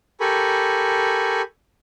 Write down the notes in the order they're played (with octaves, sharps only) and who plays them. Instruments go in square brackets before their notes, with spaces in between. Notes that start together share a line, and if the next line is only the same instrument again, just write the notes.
[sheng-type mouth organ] G4 A4 A#4 G#5 B5 C#6